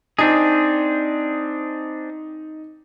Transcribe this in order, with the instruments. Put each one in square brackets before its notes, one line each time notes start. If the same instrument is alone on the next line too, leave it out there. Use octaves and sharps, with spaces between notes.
[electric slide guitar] C4 D4 G#4 [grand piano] D#4